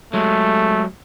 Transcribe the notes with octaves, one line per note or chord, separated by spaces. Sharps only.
F#3 G#3 A3